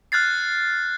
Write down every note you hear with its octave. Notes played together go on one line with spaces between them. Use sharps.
F6 F#6 G#6 A6 C7